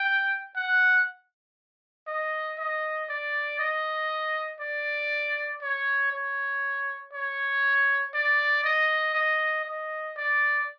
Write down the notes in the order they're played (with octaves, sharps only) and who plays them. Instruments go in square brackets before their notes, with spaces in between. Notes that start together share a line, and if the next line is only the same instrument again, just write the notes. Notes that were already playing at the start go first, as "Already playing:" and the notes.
Already playing: [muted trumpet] G5
F#5
D#5
D#5
D5
D#5
D5
C#5
C#5
C#5
D5
D#5
D#5
D#5
D5